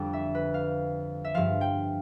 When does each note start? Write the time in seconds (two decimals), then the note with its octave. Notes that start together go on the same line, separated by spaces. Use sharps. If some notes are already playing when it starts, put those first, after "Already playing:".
Already playing: F2 D3 G3 G5
0.13 E5
0.35 B4
0.54 F5
1.24 E5
1.34 G2 F3 F5
1.61 G5